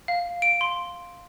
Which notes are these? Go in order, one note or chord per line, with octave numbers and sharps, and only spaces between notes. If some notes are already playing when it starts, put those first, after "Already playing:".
F5
D7
C6